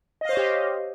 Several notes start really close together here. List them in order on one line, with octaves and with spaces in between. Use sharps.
D#5 F5 C5 C#5 G4